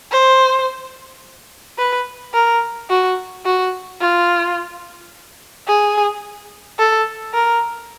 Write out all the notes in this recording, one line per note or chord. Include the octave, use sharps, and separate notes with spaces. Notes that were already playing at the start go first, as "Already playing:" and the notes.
C5
B4
A#4
F#4
F#4
F4
G#4
A4
A#4